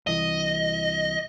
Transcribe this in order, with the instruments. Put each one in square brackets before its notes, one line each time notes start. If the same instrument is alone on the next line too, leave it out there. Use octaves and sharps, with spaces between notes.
[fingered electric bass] C2 E3 [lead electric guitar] D#5